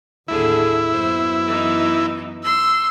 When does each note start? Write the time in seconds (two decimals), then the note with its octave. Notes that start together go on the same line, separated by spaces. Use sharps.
0.28 D#2 A2 D3 E4 G#4
0.91 F#2 B3 C5
1.46 E3 D#4
2.44 C6 E6